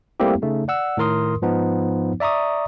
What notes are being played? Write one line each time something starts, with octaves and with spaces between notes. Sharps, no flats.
G3 A3 A#3 C4 E4 G4
C#3 A3 D#4
D5 F#5 E6
A2 D#3 A#4 C6 D#6
G#2 F3 B3 D#4
D5 E5 A#5 C#6 D#6